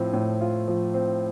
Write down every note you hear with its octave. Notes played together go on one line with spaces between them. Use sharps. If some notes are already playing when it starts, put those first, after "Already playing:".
Already playing: A2 F3 C4
A2
F4
F3
C4